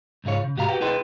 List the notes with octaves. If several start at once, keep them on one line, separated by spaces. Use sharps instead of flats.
C#2 G#2 G#3 F4 C#5
C#3
C2 G#2 F#4 G4 F5 A#5
F#4 G4 B4 F#5 G5
E4 G#4 B4 D#5 G5 C6